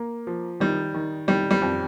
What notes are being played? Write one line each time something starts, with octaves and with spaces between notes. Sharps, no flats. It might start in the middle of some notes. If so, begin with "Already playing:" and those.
Already playing: A#3
F3
D#3 G3
D#3
D#3 G3
G3
F2